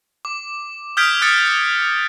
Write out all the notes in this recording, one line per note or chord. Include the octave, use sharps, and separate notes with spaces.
D6
D#6 F6 G6 G#6 B6 D7
D#6 F#6 A6 C#7